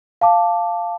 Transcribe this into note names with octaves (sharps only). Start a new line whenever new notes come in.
F5 A5 D6